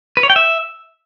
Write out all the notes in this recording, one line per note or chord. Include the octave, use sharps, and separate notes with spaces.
B4
C#5
G5
E5